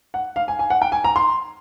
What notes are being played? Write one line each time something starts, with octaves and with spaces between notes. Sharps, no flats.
F#5
F5
G#5
G#5
F#5
G5
G#5
A#5
C6